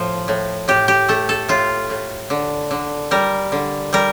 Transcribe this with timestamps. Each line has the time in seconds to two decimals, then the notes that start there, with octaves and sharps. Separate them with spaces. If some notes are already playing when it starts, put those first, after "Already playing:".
Already playing: A2 F3
0.28 A2
0.68 A2 G4
0.88 G4
1.08 A3 A4
1.29 A4
1.49 A2 F4
1.90 A2
2.30 D3
2.71 D3
3.11 G3 A#4
3.52 D3
3.93 G3 A#4